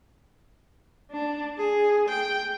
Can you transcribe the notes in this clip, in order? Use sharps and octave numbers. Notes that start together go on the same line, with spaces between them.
D4
G#4
G5